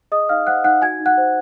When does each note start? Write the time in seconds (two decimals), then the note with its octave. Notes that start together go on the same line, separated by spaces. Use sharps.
0.12 G#4 D#5 D#6
0.29 D#4 F5 F6
0.47 C5 F#5 F#6
0.64 D#4 F#5 F#6
0.82 F#4 G#5 G#6
1.00 D#4
1.06 F#5 F#6
1.18 C5